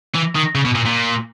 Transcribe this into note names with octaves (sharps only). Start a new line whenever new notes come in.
E3
D#3
C#3
B2
A#2
A#2